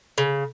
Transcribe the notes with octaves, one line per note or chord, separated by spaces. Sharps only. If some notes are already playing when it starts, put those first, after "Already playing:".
C#3